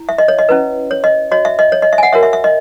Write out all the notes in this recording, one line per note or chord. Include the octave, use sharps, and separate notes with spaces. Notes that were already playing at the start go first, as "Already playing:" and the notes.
Already playing: E4
E5
D#5
C#5
D#5
C#4 E4 B4
C#5
D#5
F#4 C#5 D#5
E5
D#5
C#5
D#5
E5
G#5
F#5
F#4 A#4 C#5 E5
E5
E5
D#5